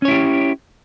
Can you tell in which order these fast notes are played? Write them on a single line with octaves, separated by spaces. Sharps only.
C#4 C#5 E4 G4